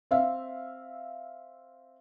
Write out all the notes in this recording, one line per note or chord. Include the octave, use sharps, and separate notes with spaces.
C4 E5 F5